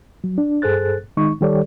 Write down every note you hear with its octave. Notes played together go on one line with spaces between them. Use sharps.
F#3
D4
G2 G#4 A4 C5 F#6 A6
D#3 G#3 D#4 C#6
D#3 G3 G4 A4 C#5 D5